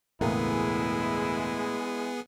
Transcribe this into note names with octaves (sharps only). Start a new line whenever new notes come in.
E1 C#2 A2 G#3 A#3 B3 E4 G#4